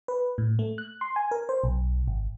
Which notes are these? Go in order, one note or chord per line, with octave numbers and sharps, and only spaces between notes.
B4
A2
A3
F#6
C6
G#5
A#4
C5
B1
G#1